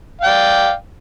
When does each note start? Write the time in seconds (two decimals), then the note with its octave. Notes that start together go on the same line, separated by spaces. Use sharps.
0.21 F5
0.24 G5
0.26 D5